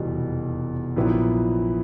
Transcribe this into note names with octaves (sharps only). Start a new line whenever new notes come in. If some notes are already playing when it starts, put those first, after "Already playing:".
Already playing: F1 E2 B2 G3
A#1 A#2 F#3 B3 E4